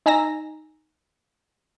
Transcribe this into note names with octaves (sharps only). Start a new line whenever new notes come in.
D#4 G#5 A#5 E6 A#6